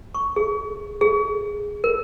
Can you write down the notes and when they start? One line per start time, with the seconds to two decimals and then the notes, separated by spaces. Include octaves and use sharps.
0.15 C#6
0.36 G#4
1.01 G#4
1.84 A#4